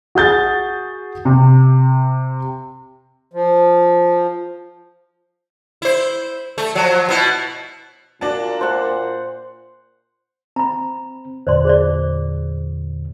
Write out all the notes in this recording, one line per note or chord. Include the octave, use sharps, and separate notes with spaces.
F#4 G#4 G6 A6
C3
F3
E4 C5
A3
F3 F#3
B2 E4
A#2 D4 F#4 A5
C5 F#5
C4 A#5 B5
E2 A#2 D3 C5 D5 C6
G#4 C5 D5